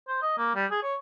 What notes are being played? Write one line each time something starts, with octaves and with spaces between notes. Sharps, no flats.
C5
D#5
A#3
G3
G#4
C#5